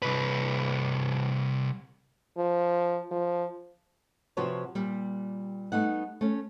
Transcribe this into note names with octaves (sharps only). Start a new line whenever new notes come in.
C2 B4
F3
F3
C3 F3 F#4 B4 C#5 A5
A#2 G3
A3 B3 D#4 F#5
A3 C#4